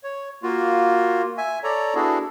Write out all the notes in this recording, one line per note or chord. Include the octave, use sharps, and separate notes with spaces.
C#5
A#3 F4 F#4
E5 G#5
A4 C#5 D5 A#5
B3 D4 E4 F#4 G#4 A4